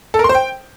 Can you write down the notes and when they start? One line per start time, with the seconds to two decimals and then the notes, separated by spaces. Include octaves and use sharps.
0.14 A4
0.19 A#4
0.24 C6
0.29 C5
0.35 G5